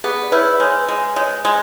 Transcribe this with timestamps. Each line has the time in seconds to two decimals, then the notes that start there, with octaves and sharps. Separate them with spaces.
0.04 B3 G#4
0.23 D5
0.32 E4 B4 C#5
0.60 G#3 B4 C#5
0.89 G#3
1.16 G#3 C#5 D#5
1.45 G#3